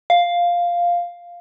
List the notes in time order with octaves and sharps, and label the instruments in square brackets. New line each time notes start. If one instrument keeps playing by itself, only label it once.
[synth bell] F5